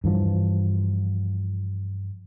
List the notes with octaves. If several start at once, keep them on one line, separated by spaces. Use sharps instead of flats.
G2 E3 F3